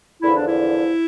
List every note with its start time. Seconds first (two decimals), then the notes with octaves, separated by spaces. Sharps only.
0.22 E2 D3 F3 E4
0.36 D4
0.47 E4